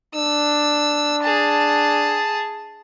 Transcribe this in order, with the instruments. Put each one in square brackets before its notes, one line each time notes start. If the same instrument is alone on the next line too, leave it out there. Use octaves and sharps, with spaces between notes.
[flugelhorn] D4 [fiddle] E6
[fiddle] G#4 A5